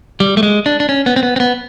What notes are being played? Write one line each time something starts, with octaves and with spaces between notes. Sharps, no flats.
G3
A3
G#3
D4
D4
C#4
B3
C4
B3
C4
B3